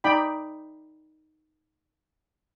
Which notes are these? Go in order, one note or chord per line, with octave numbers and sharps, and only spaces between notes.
D#4 D5 G5 B5